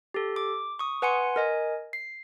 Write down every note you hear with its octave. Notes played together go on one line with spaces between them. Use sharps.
G4 A4
D6
C#6 D#6
B4 F#5 G#5 C6 C#7
A#4 D#5 G#5
C7